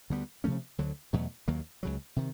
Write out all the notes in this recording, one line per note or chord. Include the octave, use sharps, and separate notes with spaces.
D2 D3 G3 B3
C3 F3 A3 C#4
D2 D3 F#3
E2 B2 F#3 A3
D#2 D#3 F#3 A#3
C#2 C#3 F#3
C3 D#3